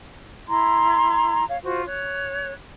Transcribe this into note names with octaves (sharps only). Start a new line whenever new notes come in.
E4 A#5 C6 G#6
C#5 F5
F4 F#4 C5
C#5 F#6